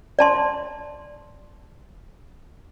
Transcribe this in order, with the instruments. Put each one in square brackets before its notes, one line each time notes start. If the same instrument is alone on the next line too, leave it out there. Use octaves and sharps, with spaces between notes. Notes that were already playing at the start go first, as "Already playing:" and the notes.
[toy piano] D5 A5 C6